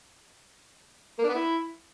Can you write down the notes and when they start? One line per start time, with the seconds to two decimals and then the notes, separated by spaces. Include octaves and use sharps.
1.19 A#3
1.24 D4
1.29 B3
1.34 E4